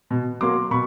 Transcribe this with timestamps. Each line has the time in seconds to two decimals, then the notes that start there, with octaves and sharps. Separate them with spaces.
0.11 B2
0.41 F#3 A#3 C6 D6
0.71 B2 B5 C#6